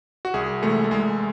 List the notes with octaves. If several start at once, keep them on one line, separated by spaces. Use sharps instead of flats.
F#4
C2 G#4
C3 E3 G#3 A3
A3
C2 G#3